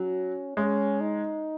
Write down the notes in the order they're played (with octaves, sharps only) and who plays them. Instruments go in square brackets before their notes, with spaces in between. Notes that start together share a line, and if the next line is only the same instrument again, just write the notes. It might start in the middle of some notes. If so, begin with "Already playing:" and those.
Already playing: [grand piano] F#3 [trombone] C#4
[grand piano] G#3 [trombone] C#4
[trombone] D#4